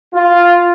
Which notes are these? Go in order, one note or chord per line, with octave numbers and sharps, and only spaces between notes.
F4